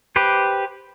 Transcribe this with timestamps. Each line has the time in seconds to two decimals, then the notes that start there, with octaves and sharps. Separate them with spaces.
0.16 G4 B4 C5